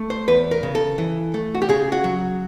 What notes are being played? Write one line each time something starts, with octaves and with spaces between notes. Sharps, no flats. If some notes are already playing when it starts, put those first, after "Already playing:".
Already playing: A3
C5
E2 B4
A#4
C#3
A4
E3
A3
F#4
G4
C#3 G#4
F#4
F#3